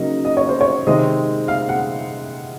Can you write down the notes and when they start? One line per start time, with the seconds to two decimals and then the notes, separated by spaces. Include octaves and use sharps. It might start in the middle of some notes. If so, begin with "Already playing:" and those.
Already playing: C#3 F#3 A#3 D#4
0.25 D#5
0.37 C#5
0.49 C5
0.61 C#5
0.87 C3 D#3 G#3 C4 D#5
1.48 F5
1.69 F#5